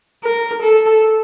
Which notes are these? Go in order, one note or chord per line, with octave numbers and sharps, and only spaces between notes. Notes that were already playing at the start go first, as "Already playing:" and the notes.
A#4
A4